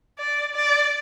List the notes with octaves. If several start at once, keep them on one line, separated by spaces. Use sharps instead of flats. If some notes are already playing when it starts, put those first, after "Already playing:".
D5
D5